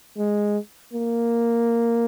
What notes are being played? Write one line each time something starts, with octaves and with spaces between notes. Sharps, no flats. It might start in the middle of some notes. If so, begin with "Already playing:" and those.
G#3
A#3